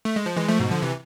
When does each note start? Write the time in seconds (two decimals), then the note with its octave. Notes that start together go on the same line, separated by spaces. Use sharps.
0.05 A3
0.16 G#3
0.26 F3
0.36 E3 G#3
0.48 F3 A3
0.59 G#2 B2
0.71 D3 F3
0.82 C3 E3